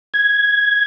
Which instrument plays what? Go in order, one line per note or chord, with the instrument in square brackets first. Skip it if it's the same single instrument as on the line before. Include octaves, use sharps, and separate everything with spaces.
[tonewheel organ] G#6